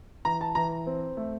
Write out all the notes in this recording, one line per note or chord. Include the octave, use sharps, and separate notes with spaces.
E3 A#5
A5
E3 A#5
C4
A3